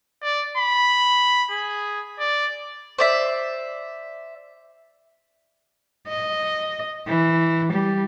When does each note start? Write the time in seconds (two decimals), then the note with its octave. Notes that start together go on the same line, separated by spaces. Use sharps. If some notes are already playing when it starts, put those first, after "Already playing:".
0.23 D5
0.57 B5
1.51 G#4
2.20 D5
2.99 C5 D5 E5
6.08 D#5
7.07 E3
7.73 G3